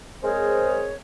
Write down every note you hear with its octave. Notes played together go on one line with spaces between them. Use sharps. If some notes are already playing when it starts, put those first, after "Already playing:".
G#3 C4 G#4 A#4 C5 C#5